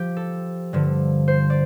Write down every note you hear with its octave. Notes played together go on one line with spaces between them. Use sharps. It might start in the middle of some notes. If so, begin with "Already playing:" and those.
Already playing: F3 G4
A4
G2 D3 F3
C5
D5